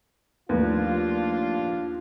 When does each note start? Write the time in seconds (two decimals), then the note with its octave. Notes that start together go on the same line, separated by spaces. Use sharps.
0.49 D#2 F3 A3 D4 F4 B4